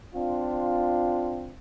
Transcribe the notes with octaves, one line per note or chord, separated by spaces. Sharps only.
C4 D4 F4